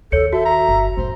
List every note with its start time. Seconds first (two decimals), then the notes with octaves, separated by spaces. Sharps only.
0.12 D#2 A4 C#5 C#7
0.33 F#4 A4 E5
0.45 A#5
0.68 G1
0.97 F1 A2 C5